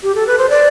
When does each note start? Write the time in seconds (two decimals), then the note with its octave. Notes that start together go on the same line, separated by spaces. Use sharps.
0.03 G4
0.15 A4
0.27 B4
0.38 C5
0.50 D5